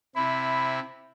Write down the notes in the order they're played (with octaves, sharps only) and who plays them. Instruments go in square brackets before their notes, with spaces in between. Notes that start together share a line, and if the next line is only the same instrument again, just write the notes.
[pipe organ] C3 E4 [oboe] B5